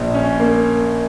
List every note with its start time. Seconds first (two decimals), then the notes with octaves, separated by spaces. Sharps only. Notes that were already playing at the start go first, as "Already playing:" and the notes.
Already playing: A#1
0.14 C#4
0.40 A#3